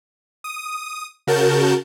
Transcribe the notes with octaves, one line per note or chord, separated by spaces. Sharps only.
D#6
C#3 F#4 A#4 A5 G6